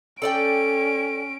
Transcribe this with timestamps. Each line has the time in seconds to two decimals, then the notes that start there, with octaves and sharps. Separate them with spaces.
0.22 C#4 A4 D5 G5 D7